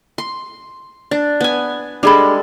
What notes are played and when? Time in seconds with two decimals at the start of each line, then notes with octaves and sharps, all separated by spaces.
0.18 C6
1.11 D4
1.41 B3 G#5
2.03 G3 G#3 D4 G#4 A4 B5